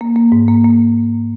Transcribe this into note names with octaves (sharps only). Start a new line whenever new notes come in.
A#3
A#3
G#2
A#3
A#3